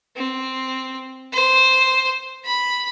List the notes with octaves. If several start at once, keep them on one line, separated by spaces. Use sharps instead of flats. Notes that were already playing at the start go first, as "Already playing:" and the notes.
C4
C5
B5